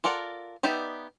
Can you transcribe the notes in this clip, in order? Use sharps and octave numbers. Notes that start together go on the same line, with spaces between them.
F4 A4 A#4 D5 F#5
B3 D#4 G4 D5 E5